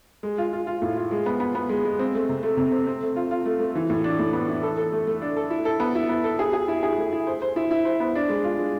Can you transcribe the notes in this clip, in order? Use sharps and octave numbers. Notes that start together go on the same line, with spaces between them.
G#3
F4
F4
F4
A2
F4
G#3
B3
B3
B3
G#3
G#3
C4
A3
C3
A3
C3
C4
C4
A3
F4
F4
A3
A3
E3
A2
D4
A2
B3
E3
A4
A4
A3
A3
D4
A4
E4
A4
B3
E4
B3
A4
G#4
G#4
E4
G#4
A3
E4
C5
C5
E4
E4
C5
B3
D4
G#3
F4
G#3